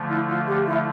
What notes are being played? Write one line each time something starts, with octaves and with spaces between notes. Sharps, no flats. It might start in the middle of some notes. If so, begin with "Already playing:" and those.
Already playing: D3 F3 A3
E4
F4
G4
E4